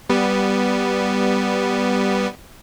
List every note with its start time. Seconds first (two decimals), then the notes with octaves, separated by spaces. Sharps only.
0.09 G3 B3